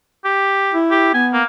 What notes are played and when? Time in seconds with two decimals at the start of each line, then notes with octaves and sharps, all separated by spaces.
0.25 G4
0.74 E4
0.91 G4
1.14 B3 G#5
1.33 A#3